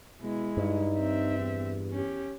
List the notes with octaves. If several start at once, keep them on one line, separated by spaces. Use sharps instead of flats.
B2 G#3 E4
G2 D#4
C4 E5
E2
C#4 G4